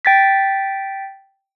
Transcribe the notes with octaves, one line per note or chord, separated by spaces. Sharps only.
G5 A6 B6